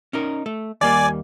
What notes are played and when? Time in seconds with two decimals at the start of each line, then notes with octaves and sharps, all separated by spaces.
0.13 C#4 D#4 A#4
0.46 A3
0.81 D#2 G3 A#3 D5 G#5